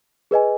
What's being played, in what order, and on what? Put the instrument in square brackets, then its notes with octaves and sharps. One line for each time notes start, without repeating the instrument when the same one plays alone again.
[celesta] G#4 B4 D#5 G#5